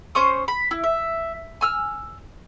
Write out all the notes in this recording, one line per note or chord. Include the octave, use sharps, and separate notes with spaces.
C#4 C5 C#6 D#6
B5
E4
E5
G#5 E6 F6